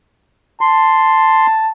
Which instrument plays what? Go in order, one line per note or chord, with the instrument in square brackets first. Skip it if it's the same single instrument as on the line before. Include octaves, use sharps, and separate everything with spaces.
[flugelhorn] A5 [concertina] C6